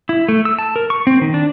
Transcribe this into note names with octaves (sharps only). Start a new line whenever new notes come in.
E4
A3
E6
A5
A#4
C#6
C4
D#3
D4